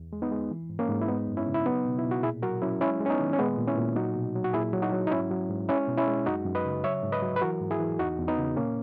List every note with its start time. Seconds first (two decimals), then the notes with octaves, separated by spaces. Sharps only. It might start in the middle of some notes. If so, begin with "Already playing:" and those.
Already playing: E2
0.13 G#3
0.22 B3 D#4
0.31 G#3
0.51 E3
0.70 G#2
0.79 A#3 C#4
0.89 G#2
1.02 E4
1.08 G#3 B3 D#4
1.28 F#2
1.37 C#4 E4
1.47 C#3
1.54 E4
1.66 F#3 B3 D#4
1.85 B2
1.99 E4
2.04 B2
2.11 F#4
2.23 A#2 E4 G#4
2.42 F#3 F#4 A#4
2.62 F#3 C#4 E4
2.81 G#3 C#4 E4
3.00 G#3
3.06 C#4
3.10 B3 D#4
3.20 D#3
3.33 C#4
3.39 A#2 G#3 B3
3.58 A#2
3.68 C#4 E4
3.77 A#2
3.96 F#3 D#4 F#4
4.15 B2
4.35 F#3
4.44 F#4
4.53 A#2 E4 G#4
4.73 F#3
4.82 D#4 F#4
4.92 F#3
5.07 D#4
5.11 G#2 C#4 E4
5.31 F#3
5.50 G#2
5.69 G#3 C#4 E4
5.88 B2
5.98 C#4 E4
6.07 G#3
6.26 F#2 D#4 F#4
6.46 F#2
6.55 B4 D#5
6.65 C#3
6.84 F#3 C#5 E5
7.03 G#2
7.12 B4 D#5
7.22 F#3
7.36 B4
7.41 E3 F#4 A#4
7.61 G#2
7.71 E4 G#4
7.80 E3
7.99 E2 D#4 F#4
8.19 E2
8.28 B3 D#4
8.38 C#3
8.57 A#2 A#3 C#4